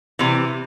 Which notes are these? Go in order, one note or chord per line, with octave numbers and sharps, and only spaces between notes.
C3 E3